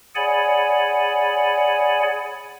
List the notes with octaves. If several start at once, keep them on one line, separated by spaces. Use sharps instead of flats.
G#4 C#5 D5 F#5 G#5 B5